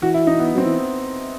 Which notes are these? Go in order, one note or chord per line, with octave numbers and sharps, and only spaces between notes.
E3 F#4
E4
D#4
B3
F#3 C4
E3